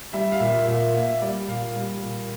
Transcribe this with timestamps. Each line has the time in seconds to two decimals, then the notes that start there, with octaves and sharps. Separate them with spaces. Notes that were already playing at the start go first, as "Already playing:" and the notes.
0.13 G3 E5
0.32 F5
0.40 A#2 E5
0.67 A#2 E5
0.95 A#3 E5
1.22 G3 D5
1.49 A#2 F5
1.76 G3
2.03 A#2